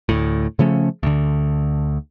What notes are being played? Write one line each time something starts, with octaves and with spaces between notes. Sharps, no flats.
D2 A2
C#3 F3 A3 C#4
D2 D3